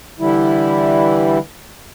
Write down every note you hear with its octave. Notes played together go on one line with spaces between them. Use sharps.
D3 E3 G3 E4